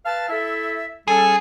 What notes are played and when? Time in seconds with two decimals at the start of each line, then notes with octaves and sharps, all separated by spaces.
0.05 B4 F5 A5
0.29 E4 A4 E5
1.08 G3 C#4 G#4 A4